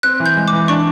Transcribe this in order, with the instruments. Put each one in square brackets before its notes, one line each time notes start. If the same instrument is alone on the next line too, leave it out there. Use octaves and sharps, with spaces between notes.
[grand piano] C4 [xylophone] F#6
[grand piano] E3
[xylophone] G6
[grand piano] G#3
[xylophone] D6
[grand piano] E3
[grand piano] D4 [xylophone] C#6